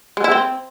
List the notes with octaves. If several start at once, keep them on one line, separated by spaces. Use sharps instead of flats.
G#3
E4
C4